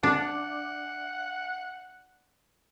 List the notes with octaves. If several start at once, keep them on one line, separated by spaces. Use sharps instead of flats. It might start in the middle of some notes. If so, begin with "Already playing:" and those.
D4 F#5